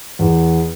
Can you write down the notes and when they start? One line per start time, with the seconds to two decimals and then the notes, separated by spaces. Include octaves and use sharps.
0.19 E2